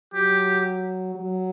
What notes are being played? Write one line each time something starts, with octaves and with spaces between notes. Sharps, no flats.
F#3 G4
F#3